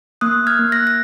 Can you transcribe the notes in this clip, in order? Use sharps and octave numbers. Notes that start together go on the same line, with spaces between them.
A#3 D#6 F#6
F6 G#6
A#3
F#6 A#6
A#6